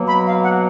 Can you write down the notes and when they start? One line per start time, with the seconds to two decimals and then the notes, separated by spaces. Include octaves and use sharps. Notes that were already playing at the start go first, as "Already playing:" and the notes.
Already playing: B2 F#3 A#3
0.09 B5
0.26 F5
0.44 F#5